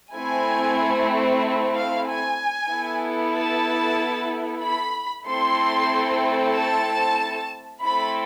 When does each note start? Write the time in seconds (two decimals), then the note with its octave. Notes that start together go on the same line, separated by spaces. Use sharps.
0.14 A3 C4 E4 G#5
1.75 F5
2.06 G#5
2.70 B3 E4 A4
3.35 A5
4.64 B5
5.28 A3 C4 E4 A4 C6
6.56 A5
7.84 A3 C4 E4 A4 B5